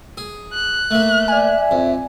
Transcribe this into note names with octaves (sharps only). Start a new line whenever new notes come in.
G#4
F#6
A3 A#3 E5
D5 G#5
F2